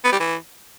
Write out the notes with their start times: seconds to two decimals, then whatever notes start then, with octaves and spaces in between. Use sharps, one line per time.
0.05 B3
0.12 G3
0.20 E3